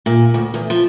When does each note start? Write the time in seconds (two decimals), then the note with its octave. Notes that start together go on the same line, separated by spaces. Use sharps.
0.06 A#2
0.34 D2
0.54 E2
0.70 F3